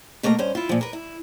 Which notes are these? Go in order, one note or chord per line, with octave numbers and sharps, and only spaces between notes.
B2 A3 A#3 D5 A#5
G2 C#4 C5
E4 F4
A#2 F3
A#4 B4
E4